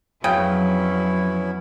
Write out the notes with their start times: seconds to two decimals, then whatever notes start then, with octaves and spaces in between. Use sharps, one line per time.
0.24 F2 C#3 F#3 B3 C#4 E4 G5